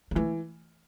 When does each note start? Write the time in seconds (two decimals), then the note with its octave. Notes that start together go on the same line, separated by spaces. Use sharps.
0.11 A#3
0.15 E3 A3